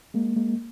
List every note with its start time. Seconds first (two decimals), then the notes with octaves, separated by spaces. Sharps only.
0.14 G#3 A#3
0.36 G#3 A#3